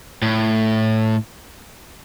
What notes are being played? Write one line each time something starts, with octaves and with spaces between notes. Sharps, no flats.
A2